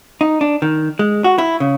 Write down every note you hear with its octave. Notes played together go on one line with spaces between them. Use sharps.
D#4
D4
D#3
G#3
F#4
E4
C#3